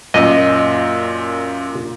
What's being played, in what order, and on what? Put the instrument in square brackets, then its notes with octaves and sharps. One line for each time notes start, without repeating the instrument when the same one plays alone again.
[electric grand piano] F#2 A#2 [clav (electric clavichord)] D#5